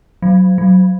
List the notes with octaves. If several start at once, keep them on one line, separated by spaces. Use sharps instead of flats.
F#3
F#3